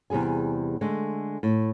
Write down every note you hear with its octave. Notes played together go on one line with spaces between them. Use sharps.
E2 C3 G3 G#4 G#5
D3 G#3 A3
A2